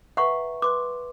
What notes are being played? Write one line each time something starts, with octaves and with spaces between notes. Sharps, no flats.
B4 E5 F#5 A#5 C#6
B4 C6 D6 F#6